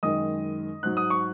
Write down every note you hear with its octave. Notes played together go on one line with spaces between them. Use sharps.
F#2 D#3 G#3 D#5 D#6
G#2 F#3 F#6
D#6
C#6